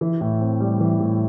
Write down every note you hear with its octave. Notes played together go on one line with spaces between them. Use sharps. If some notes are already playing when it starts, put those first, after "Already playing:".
E3
A2
C4
G3
E3
A2